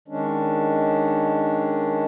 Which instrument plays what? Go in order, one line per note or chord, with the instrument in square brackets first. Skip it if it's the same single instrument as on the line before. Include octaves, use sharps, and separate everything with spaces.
[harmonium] D#3 G#3 C#4 D4